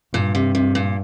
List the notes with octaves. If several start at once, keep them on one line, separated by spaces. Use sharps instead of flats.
G2 A#2
C3
C3
A#2